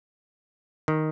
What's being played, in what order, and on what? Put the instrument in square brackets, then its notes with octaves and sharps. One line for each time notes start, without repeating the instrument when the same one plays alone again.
[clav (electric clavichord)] D#3